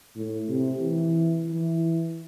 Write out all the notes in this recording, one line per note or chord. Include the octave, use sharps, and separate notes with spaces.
A2
C3
E3
E3